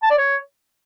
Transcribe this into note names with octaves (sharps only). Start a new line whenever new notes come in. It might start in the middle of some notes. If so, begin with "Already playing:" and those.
A5
D5
C#5